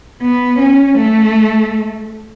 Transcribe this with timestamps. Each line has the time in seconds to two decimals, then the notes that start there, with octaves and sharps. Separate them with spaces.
0.21 B3
0.59 C#4
0.97 A3